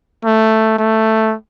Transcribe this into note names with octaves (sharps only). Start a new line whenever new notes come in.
A3
A3